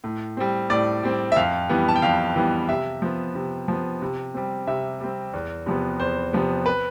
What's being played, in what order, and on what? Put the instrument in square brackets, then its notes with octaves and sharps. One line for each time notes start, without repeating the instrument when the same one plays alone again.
[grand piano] A2
G3 C4
A2 D5
G3 C4
E5
F2 F5
E3 G3 B3
A5
G5
F2 F5
E3 G3 B3
C3 E5
F3 B3
C3
F3 B3
C3
G3 C4
C3 E5
G3 C4
E2
C3 F3 B3
E2 C5
C3 F3 B3
B4